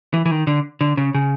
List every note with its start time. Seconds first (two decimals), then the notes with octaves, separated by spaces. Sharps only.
0.14 E3
0.26 E3
0.31 D#3
0.47 D3
0.81 D3
0.97 C#3
1.14 C#3